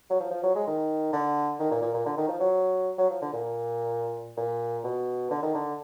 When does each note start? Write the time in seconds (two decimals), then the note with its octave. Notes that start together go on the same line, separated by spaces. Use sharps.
0.11 F#3
0.20 F3
0.31 F3
0.43 F#3
0.55 G#3
0.67 D#3
1.13 D3
1.59 D#3
1.71 A#2
1.82 A#2
1.94 A#2
2.06 D3
2.17 D#3
2.28 F3
2.40 F#3
2.98 F#3
3.10 F3
3.22 D3
3.33 A#2
4.37 A#2
4.84 B2
5.30 D3
5.42 D#3
5.55 D3